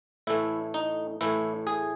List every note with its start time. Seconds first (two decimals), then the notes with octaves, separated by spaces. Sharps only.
0.27 A2 E3 A3 E4
0.74 D#4
1.21 A2 E3 A3 E4
1.67 G#4